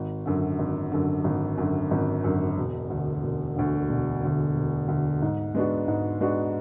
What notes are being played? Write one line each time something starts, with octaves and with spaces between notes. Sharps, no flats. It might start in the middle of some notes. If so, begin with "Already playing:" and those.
Already playing: G#1
F#2 D3
G#1
F#2 D3
G#1
F#2 D3
G#1
F#2 D3
E1
D2 D3
E1
D2 D3
E1
D2 D3
E1
D2 D3
G#2
G#3 B3 D4 F#4
G#2
G#3 B3 D4 F#4